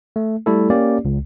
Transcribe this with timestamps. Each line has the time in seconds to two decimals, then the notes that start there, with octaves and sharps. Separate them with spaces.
0.16 A3
0.46 G3 A3 E4 A4
0.70 A#3 C#4 G4 D5
1.05 C#2